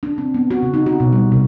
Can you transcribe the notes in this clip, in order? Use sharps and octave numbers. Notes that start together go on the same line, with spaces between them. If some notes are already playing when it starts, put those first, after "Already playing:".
D4
C4
B3
F#4
C#3
D#4
F#4
B2
G3
C3